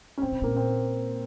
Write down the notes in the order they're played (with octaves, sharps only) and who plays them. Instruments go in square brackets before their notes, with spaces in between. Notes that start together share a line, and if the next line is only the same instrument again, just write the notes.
[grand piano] C#4
[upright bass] A#2 [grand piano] C4
[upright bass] G#2
[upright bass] A#2 [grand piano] A#3
[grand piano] C4